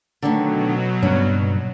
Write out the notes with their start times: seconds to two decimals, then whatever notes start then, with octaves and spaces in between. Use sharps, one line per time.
0.22 B2 D3 D#3 F#3 A3
1.03 G2 A#2 C#3 C#4